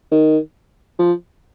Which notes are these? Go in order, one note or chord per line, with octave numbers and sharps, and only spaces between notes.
D#3
F3